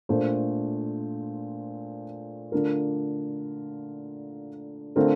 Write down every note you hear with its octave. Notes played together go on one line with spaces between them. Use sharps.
A#2 A3 D4 A4 C5
D3 A3 D4 F4 A#4
D3 A3 C4 F4 A#4